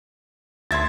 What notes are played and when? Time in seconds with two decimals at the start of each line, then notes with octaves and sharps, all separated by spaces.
0.71 D2 E5 C6 G#6 A6